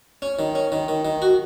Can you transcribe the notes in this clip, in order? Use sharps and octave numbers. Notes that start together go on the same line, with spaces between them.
C#4
D#3
C#4
D#3
D#3
D#3
F#4